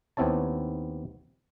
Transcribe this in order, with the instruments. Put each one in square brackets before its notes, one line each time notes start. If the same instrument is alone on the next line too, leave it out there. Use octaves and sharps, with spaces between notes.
[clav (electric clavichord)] D#2 B3 C4 E4 C#5 A5